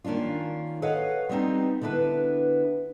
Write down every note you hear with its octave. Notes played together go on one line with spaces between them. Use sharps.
D#3 A#3 C#4 D4 F4
A4 B4 C#5 D#5 F5 F#5
G3 B3 C4 D#4
D3 B3 D4 E4 B4